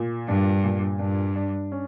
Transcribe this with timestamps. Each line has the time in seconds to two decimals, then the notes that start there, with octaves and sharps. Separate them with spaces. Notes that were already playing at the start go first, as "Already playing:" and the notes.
Already playing: A#2
0.28 G2 D4
0.64 A#2
0.99 G2 D4
1.36 D4
1.72 C#4